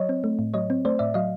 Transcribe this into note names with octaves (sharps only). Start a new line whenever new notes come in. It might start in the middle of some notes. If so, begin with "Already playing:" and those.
Already playing: F#3 C#5 D#5
C4
A3
A2
F#3 C#5 D#5
C4
A3 C5 D5
A2 D5 E5
F#3 D#5 F5